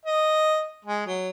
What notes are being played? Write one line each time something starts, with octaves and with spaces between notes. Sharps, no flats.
D#5
G#3
F#3